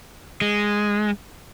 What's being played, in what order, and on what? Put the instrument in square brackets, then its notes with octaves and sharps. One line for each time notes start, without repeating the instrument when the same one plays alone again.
[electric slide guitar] G#3